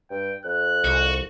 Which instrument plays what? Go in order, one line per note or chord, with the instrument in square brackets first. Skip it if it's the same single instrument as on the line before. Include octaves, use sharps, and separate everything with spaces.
[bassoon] G2 [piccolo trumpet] G5
[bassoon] F2 [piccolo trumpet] F#6
[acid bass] C2 [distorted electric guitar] F#4